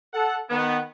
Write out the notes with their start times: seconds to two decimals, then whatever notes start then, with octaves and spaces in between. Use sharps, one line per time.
0.13 A4 F#5
0.49 D#3 B3